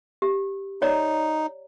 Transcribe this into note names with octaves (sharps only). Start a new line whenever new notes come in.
G4
D#4 C#5 D5 A#5